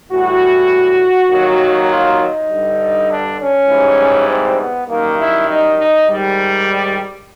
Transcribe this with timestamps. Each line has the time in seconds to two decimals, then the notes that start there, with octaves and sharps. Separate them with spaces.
0.11 A2 E3 G3 F#4
1.30 D#2 D#3 F#3
1.90 F4
2.20 D#4
2.49 G2 D3 G3
3.09 D4
3.39 C#4
3.68 G#2 E3 G3
4.28 C4
4.58 B3
4.87 F#2 D#3 G3 A#3
5.17 E4
5.47 D#4
5.77 D#4
6.06 G#2 D#3 G3